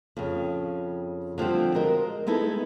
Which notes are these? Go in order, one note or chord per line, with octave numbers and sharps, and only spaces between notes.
F2 C#3
D3 F3 G3 C4
G#3 F#4 A#4 D#5
G#3 B3 D#4 E4 A4